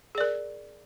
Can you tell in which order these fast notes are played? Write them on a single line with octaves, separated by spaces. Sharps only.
G#4 D5 A#4